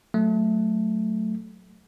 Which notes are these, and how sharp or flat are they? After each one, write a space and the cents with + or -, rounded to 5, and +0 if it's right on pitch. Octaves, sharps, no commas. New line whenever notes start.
F#3 +0 A3 +0